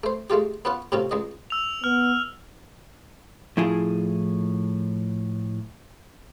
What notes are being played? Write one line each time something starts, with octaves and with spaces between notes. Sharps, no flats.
A3 C5
G#3 A3 F4 G4
B3 C#4 F4 F#5
A2 C3 C4 C#4 F4
C#2 G#3 D#5
E6 F7
B3 F6
A2 F3 E4 F4 G#4